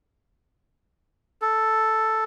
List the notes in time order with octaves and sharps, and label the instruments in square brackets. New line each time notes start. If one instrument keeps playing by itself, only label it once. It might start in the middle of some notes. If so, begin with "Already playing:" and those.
[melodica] A4